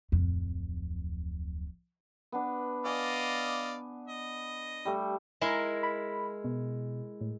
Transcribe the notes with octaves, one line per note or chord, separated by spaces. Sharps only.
D1 F2
B3 D4
D5 D#5 F5 G#5
D#5
G3 A3
G#3 E4 A#4
B5
B2
A2